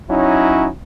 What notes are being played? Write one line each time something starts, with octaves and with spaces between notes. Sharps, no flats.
F#3 C#4 D#4 E4